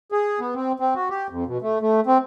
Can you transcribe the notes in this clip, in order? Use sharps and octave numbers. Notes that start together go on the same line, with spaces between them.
G#4
B3
C4
C4
F#4
G4
F2
B2
A3
A3
C4